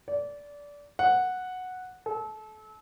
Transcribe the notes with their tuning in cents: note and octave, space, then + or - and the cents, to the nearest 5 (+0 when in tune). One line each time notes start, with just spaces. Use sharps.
D5 -20
F#5 -5
A4 -30